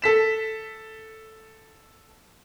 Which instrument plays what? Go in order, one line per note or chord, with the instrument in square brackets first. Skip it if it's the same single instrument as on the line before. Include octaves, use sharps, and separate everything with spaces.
[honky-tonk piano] A4 B6 E7